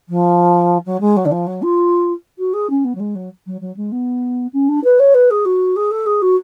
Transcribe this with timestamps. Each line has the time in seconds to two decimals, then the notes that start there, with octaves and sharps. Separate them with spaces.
0.09 F3
0.86 F#3
1.00 G#3
1.17 F#3
1.25 D3
1.31 F3
1.47 F#3
1.62 F4
2.38 F#4
2.53 G#4
2.70 C#4
2.84 B3
2.95 F#3
3.00 G#3
3.15 F#3
3.46 F#3
3.61 F#3
3.76 G#3
3.92 B3
4.53 C#4
4.68 D4
4.84 B4
4.99 C#5
5.14 B4
5.30 G#4
5.45 F#4
5.76 G#4
5.91 A4
6.06 G#4
6.22 F#4